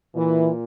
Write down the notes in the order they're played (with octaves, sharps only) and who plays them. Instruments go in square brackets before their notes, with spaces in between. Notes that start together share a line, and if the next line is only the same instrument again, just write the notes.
[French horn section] A#2 E3